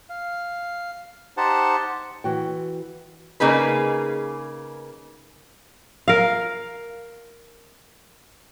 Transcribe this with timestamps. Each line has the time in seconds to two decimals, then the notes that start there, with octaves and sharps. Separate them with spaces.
0.09 F5
1.37 D#4 G4 C5 F#5 A5
2.24 E3 F#4 G5
3.40 C#3 A#3 D#4 G#4 B4
6.08 A#4 F5